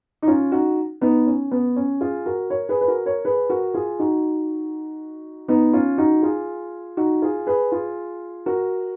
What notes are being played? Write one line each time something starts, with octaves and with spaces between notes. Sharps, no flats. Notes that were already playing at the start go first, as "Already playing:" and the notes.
D#4
C#4 F4
D#4 F#4
B3 D#4
C#4
B3
C#4
F4 G#4
F#4 A#4
A#4 C#5
G#4 B4
B4
F#4 A#4
A#4 C#5
G#4 B4
F#4 A#4
F4 G#4
D#4 F#4
B3 D#4
C#4 F4
D#4 F#4
F4 G#4
D#4 F#4
F4 G#4
G#4 B4
F4 G#4
F#4 A#4